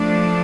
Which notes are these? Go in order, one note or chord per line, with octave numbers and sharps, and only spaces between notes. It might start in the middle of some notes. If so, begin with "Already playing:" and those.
Already playing: F3 A3 D4